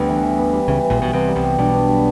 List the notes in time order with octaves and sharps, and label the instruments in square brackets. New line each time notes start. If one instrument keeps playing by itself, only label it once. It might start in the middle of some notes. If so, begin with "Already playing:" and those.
Already playing: [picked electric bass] D2 D3 [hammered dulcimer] G3 B3
[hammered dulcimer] E3
E3
B3
G3
[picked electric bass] C#2 C#3 [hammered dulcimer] E3
[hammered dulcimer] E3
[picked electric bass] A#1 A#2
[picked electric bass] B1 B2 [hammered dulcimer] B3
[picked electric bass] C2 C3 [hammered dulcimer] B3
[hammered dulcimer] G3
[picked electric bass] C2 C3
[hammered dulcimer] G3
[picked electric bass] B1 B2 [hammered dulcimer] D4
[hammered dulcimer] B3
G3